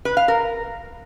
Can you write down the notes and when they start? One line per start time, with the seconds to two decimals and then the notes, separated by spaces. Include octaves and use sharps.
0.05 B4
0.17 F5
0.28 A#4